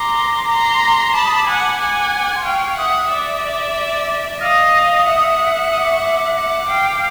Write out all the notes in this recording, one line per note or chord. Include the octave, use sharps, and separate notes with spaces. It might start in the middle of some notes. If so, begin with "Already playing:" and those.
Already playing: A#5 C6 D6
A#5 C6
A5 B5 D6
D#6
D6
F#5 G#5
F#5 G#5
C6
F5 G5 C#6
E5 F#5 D#6
D5 E5 D6
D#5 F5 D#6 F6
E5 F#5
D#6
D6
C#6
D6
E5 F#5
F5 G5